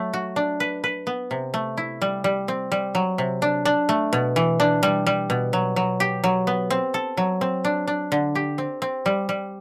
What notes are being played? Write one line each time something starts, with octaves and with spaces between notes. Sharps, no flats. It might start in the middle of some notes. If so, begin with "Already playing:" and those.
Already playing: F#3 A3
F#4
D4
B4
B4
B3
C3
A3
E4
G3
G3
C4
G3
F#3
C3
D4
D4
A3
B2
E3
D4
G3
G3
B2
F#3
F#3
G4
F#3
B3
C4
A4
F#3
C4
D4
D4
D3
G4
C4
C4
G3
G3